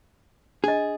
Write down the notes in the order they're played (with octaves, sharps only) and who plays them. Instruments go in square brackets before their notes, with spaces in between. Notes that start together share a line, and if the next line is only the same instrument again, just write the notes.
[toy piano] D4 D#5 [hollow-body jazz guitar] G#4